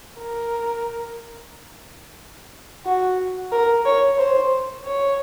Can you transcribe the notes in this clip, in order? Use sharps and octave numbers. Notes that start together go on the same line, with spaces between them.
A#4
F#4
A#4
C#5
C5
C#5